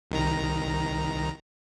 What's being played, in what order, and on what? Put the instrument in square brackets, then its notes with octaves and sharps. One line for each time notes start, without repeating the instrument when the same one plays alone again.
[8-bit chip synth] C2 D#3 A#5